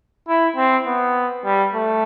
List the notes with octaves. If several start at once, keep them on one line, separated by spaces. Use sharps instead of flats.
E4
C4
B3
G3
A3